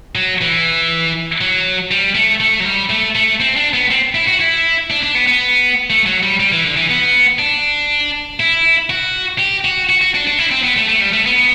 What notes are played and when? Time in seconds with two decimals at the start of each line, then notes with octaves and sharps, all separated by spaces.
0.15 F#3
0.41 E3
1.41 F#3
1.91 G3
2.15 A3
2.40 A3
2.60 F#3
2.65 G3
2.90 A3
3.15 A3
3.40 C4
3.56 D4
3.74 B3
3.91 C4
4.15 E4
4.27 F#4
4.40 E4
4.90 D4
5.03 D4
5.15 B3
5.27 B3
5.90 A3
6.06 F#3
6.23 G3
6.40 G3
6.52 E3
6.64 D3
6.77 E3
6.90 B3
7.39 D4
8.40 E4
8.90 F#4
9.39 G4
9.65 F#4
9.90 F#4
10.01 F#4
10.14 D4
10.27 D4
10.39 E4
10.51 C4
10.64 B3
10.76 A3
10.89 A3
11.01 G3
11.13 A3
11.26 B3